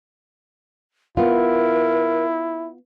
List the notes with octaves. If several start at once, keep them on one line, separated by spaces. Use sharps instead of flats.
B3 E4 F4 A#4